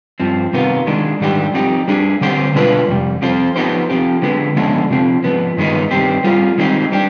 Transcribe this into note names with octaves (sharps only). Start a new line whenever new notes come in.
G2 F3 C4
C3 D#3 B3 F4
D#3 G#3 D4
G#2 D#3 G3 D4 G4
F3 C4 D#4 G4
G3 D4 G#4
D3 G3 C4 G4 C5
B2 G#3 D4 F4 B4
F2 C3 G3
F3 C4 F4 C5
F3 B3 D#4 G4 C5
F3 C4 G4
D3 G#3 B3
D3 F3 G#3 B3 D4
C3 F3 C4
G#2 F3 B3
G2 D#3 G#3 B3 D#4
G2 D#3 G3 C4 G4
G3 C4 F4 G#4
D#3 G#3 C4 D#4 G4
G3 D4 G4